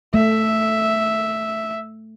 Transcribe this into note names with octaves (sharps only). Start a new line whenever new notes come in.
A3 E5